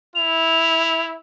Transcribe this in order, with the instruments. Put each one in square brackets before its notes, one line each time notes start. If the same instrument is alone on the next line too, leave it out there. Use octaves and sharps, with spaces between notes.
[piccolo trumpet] E4 [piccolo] F7